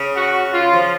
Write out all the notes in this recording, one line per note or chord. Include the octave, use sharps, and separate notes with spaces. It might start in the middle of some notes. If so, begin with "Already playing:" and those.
Already playing: C#3
F#4
F4
F3